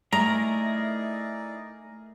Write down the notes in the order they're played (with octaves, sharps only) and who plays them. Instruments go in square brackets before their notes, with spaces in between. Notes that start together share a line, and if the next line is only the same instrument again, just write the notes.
[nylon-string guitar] A3 [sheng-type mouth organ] D#4 E4 D5 [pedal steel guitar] G#4 A#4 [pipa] A#5